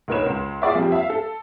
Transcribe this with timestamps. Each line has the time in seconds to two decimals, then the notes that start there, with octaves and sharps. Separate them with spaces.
0.08 D2 D#4 A#4 B4 C#5 E7
0.26 C#2
0.62 F4 G#4 D5 E5
0.75 F2 F3 G3
0.92 E5 F5
1.10 A4